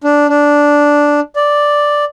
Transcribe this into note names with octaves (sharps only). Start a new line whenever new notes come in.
D4
D4
D5